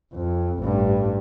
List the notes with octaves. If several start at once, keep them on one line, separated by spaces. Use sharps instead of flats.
F2
A1 G2